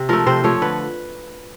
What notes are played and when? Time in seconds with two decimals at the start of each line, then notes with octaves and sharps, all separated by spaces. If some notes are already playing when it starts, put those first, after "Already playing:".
Already playing: C3
0.09 F3 A3 A#4
0.26 C3 C5
0.44 F3 A3 C#5
0.62 D3 B4